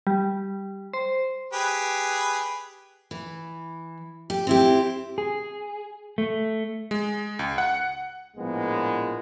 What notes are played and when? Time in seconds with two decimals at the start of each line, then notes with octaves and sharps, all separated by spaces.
0.07 G3
0.93 C5
1.53 G4 G#4 B4
3.11 E3
4.30 G4
4.47 C4 E4 G4
5.18 G#4
6.18 A3
6.91 G#3
7.39 C#2
7.58 F#5
8.37 A#1 A2 F3 G#3 A#3 B3